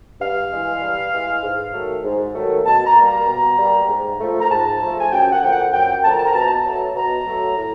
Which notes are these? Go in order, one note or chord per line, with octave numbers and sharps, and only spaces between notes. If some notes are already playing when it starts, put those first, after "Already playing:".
G2 F5
E3 G#3
G2
E3 G#3
G#2
D#3 F#3 A3
G#2
D#3 F#3 A3
B2 A5
A#5
G3 A#3
A#5
B2
G3 A#3
G#2
F3 A3
A#5
G#2 A5
F3 A3
G#5
F#2 G5
F#5
D3 F3 A#3 G5
F#5
F#2 G5
D3 F3 A#3 A5
A#5
A5
A#5
B2 A5
A#5
A5
F#3 A3
B2 A#5
F#3 A3
A2